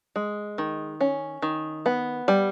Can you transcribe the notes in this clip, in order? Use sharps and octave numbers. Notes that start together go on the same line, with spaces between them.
G#3
D#3
C#4
D#3
B3
G3